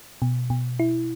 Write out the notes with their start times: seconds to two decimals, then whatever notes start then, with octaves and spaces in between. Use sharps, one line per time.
0.22 B2
0.50 B2
0.79 E4